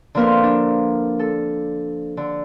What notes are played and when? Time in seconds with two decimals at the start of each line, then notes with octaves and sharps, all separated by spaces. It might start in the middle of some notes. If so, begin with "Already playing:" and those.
0.15 D3 F3 A#3 C4 A#4 B4
0.43 D4
1.19 A4
2.17 D3